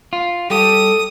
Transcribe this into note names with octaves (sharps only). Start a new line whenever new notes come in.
F4
G3 G4 A4 D#6